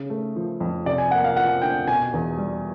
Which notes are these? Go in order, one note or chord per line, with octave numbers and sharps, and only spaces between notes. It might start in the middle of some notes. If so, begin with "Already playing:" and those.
Already playing: C#3
A3
F3
F2
C3 D5
G#5
A#3 F#5
F5
F3 F#5
D2 G5
B2 G#5
E2
G3